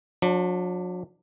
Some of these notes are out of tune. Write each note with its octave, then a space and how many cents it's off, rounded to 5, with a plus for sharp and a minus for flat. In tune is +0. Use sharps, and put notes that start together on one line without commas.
F#3 -45 D4 +0